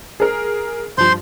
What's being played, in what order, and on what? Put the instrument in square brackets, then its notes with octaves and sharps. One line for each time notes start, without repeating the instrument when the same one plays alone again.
[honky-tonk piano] G#4 A#4
[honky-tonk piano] G2 F3 [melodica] C5 C6